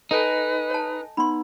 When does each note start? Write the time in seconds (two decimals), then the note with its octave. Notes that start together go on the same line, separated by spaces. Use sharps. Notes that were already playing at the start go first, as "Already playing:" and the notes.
0.11 D#4 A4 B4 C#5 D#5 G#5 A5 D7
0.70 C#5 A5
1.17 B3 D#4 B5 C6